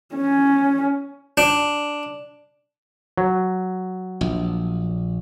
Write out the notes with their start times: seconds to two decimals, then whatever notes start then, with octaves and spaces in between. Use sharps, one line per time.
0.15 C#4
1.37 D4
3.18 F#3
4.21 A#1